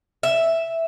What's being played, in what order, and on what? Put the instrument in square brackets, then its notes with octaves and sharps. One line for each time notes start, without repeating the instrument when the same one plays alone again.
[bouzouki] E5